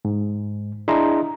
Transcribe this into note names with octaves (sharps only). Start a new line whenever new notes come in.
G#2
D4 E4 G#4 D#5 A#5 C6